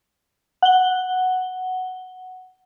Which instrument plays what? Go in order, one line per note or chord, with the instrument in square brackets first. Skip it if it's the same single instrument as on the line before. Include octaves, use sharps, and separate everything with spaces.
[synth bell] F#5 G7